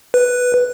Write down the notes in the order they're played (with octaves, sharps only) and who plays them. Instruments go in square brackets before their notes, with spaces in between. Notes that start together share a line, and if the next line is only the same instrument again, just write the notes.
[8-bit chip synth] B4